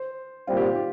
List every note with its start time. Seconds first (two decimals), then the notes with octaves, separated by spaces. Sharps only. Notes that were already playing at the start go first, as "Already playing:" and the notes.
Already playing: C5
0.47 A#2 G3 C4 F4
0.57 G4
0.61 F4
0.75 G4